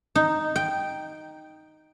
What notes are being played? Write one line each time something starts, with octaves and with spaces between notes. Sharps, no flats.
D#4
G5